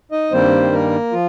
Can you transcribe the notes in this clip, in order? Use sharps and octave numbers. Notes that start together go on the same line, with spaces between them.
D#4 D#5
G2 D#3 G3 A#3 C4 C5
A#3 A#4
F3 F4